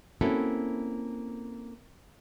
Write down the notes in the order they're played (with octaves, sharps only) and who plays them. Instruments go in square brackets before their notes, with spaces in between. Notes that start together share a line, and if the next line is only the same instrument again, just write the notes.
[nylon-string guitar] A#3 C4 C#4 E4 F#4 A4